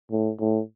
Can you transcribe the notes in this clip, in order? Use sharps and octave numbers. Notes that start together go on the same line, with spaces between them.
A2
A2